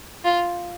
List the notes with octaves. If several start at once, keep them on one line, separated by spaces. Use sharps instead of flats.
F4